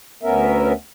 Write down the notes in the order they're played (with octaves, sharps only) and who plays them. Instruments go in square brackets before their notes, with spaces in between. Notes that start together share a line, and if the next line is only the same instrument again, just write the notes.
[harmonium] D2 B3 C#4 A#4 E5